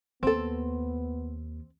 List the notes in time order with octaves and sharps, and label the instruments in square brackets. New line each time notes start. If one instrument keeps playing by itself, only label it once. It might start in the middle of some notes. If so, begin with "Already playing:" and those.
[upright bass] D#2 [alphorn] B3 [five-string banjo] C4 A4